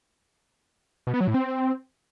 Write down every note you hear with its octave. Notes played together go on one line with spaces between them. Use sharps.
B2
B3
F#3
A2
C4